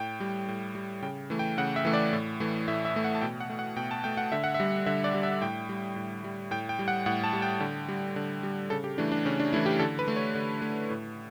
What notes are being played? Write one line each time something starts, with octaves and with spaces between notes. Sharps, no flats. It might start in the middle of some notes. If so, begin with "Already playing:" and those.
Already playing: A2 G5
G3
A2
G3
C#3 G5
E3 A3
G5
C#3 F#5
E5
E3 A3
D5
A2
E3 A3
A2 E5
E5
E3 A3
F#5
A5
B2 G5
F#5
A3
F#5
B2 G5
A5
A3 G5
F#5
D3 E5
F#5
E5
G3
D3 E5
D5
G3
E5
A2 G5
G3
A2
G3
A2 G5
G5
G3
F#5
A2 F#5
A5
G3
G5
D3
G3
D3
G3
C#3 A4
G4
E3 A3 D4
D4
C#3 C#4
D4
E3 A3 E4
G4
D3 A4
B4
A3
C#5
D3
A3
A2